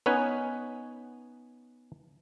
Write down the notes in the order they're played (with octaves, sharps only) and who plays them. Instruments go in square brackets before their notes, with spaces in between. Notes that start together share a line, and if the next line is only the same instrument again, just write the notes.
[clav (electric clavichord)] B3 C#4 D#4 B4 G#5